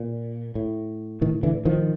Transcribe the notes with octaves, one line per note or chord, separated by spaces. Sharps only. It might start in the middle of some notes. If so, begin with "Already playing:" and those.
Already playing: A#2
A2
A2 D#3
D3 E3
D#3 F3